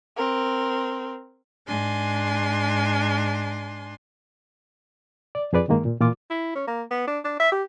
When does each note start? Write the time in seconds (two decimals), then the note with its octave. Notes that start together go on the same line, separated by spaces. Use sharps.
0.16 C4 A#4
1.67 G#2 D4 G#5 C6
5.35 D5
5.53 F2 G#4 B4 D5
5.68 G2 D#3 G#3 A#3
5.85 A#2
6.00 A#2 E3 F4 D6
6.30 E4
6.55 C#4
6.67 A#3
6.91 B3
7.07 D4
7.25 D4
7.40 E5
7.52 G4